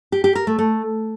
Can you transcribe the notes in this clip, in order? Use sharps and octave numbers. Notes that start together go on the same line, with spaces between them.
G4
G4
A#4
A3
A3